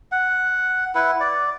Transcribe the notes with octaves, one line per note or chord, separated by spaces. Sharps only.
F#5
E4 B4 F#5
D5